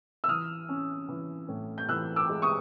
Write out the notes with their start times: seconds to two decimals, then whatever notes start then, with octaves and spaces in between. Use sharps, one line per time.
0.24 E6
0.28 E3 D#6 F6
0.69 C#4
1.09 E3
1.49 A2
1.78 G6
1.89 E3 E6 F#6
2.16 D6 E6
2.29 G#3
2.42 C#6 D#6